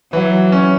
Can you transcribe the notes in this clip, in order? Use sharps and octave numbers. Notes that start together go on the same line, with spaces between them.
E3 F#3
C#4